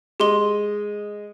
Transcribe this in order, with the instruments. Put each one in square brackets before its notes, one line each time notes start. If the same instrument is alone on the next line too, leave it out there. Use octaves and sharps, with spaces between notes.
[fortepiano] G#3 D#5 [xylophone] G4 C6 G7